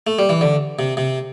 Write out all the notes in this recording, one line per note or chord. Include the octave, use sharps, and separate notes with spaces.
A3
G3
E3
D3
C3
C3